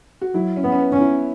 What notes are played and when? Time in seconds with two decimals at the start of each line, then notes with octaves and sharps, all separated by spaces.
0.21 F#4
0.34 F#3 E4
0.56 C#4
0.64 B3
0.72 C#4
0.79 B3
0.92 C#4
1.00 E4